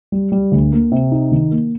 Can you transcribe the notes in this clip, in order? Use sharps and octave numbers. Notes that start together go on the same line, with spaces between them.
G3
G3
D2
A#3
C3
D#4
D#3
A#3